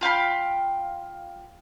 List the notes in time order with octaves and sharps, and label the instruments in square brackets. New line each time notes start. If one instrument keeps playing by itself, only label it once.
[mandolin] F4 F5 G5 B5